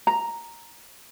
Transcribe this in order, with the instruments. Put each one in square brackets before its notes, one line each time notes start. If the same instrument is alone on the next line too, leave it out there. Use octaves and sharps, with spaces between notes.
[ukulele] A#5